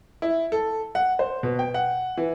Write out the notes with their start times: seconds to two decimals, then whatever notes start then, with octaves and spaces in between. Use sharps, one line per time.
0.22 E4
0.52 A4
0.95 F#5
1.19 C5
1.43 B2
1.59 G5
1.74 F#5
2.17 E3